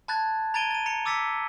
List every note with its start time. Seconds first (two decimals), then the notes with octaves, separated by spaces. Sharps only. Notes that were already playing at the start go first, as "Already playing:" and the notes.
0.08 A5 B5 F#6 G#6 A6
0.54 A#5 G#6 A6 D7 D#7 G7
0.71 A6 D#7
0.86 A#5 C#7
1.05 D6 E6 A6 B6 C#7